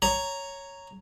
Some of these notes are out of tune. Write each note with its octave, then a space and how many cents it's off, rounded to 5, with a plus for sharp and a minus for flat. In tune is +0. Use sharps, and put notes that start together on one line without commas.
C#5 +0 A#5 +0